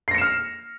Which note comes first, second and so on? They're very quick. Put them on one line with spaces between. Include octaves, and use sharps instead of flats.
C7 A#6 C#7 E7 F6